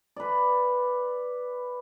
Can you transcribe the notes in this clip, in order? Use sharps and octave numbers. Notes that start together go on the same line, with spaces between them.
B4 D5